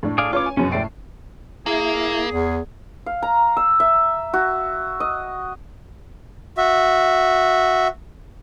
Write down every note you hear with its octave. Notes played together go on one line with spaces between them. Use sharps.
A2 D4
G#4 D5 F5
C#4 F4 B4 C#5 D6
G#5
F#1 F#2 B2 C#4
A2 D5 E5 G5 C7
A#3 E4 G#4
E2
F5
A#5
E6
E5
F#4
D#5
F#4 E5